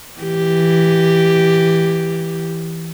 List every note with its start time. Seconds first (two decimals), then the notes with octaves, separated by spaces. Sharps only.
0.21 E3 G4